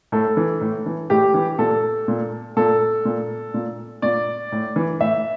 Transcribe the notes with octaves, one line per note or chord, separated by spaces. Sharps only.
A2 A4
E3
A2
E3
A2 G4
E3
A#2 A4
A#2
A#2 A4
A#2
A#2
A#2 D5
A2
E3
A2 E5